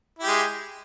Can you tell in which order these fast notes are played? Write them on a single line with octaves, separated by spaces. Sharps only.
E4 G4 G#3